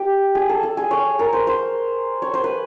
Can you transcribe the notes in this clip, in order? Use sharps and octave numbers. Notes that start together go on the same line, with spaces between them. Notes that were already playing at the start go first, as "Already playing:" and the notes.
Already playing: G4
G#4
A4
A4
G#4
C#5
A#4
C5
C5
C#5
C5
B4